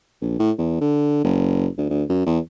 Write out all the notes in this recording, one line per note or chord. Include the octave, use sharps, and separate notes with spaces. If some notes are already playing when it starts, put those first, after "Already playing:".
A#1
A2
E2
D3
F#1
D2
D2
F#2
E2